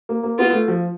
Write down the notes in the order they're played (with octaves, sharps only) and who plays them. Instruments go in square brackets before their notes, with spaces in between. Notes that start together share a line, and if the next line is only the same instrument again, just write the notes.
[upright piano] A#3
A#3
[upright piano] B3 [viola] F4
[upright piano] A3
F3